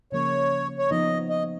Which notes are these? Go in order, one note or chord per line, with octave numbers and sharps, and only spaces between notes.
C#3 F3 A#3 C#4 C#5
C#5
F3 B3 D#4 D#5
D#5